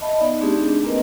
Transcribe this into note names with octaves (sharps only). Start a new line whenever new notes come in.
D#5 E5 A5 B5
B3 D#4 D5
A3 C4 D4 D#4 G4 G#4
D4
G#3 A#3 C4 A#4 B4 D#5